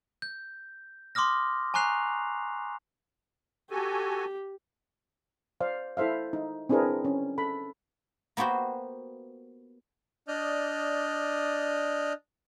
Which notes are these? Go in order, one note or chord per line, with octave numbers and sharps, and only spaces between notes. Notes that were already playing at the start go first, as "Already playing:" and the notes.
G6
C6 D6 D#6 F6 A#6
G#5 A#5 C#6 F#6 C7 F7
F#4 G4 A4 G#5
C5 D5 F5
E4 A4 C5 E5 F5
D#4
C4 D4 E4 G#4 A#4 B4
C#4
A4 B5
A#3 B3 F#4 G4 C5
D4 D5 D#5 D#6 F6 G6